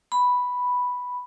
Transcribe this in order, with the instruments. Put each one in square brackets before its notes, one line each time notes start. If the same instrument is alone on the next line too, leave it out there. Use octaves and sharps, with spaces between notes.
[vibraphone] B5